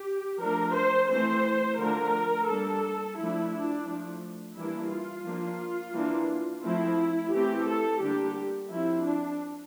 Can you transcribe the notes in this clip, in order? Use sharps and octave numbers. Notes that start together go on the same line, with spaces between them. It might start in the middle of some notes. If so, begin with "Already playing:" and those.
Already playing: G4
F3 A3 D4 A#4
C5
E3 A3 C4 C5
D3 F3 A3 D4 A#4
G3 A#3 D4 A4
F3 A3 D4 E4
D4
F3 A3 D4
E3 G3 A#3 D4 E4
F4
F3 A#3 D4
E3 A#3 D4
F3 A3 C4 E4
E3 A3 C4 G4
A4
D3 G3 A#3 D4 G4
F3 C4 E4
D4